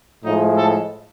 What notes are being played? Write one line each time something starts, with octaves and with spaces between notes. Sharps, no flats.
A2 F3 G#3 D#4
A4